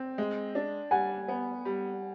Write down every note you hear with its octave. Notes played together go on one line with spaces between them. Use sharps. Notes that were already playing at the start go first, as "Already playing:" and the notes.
Already playing: C4 G5
G#3
D4
G3 F#5 G#5
B3
G3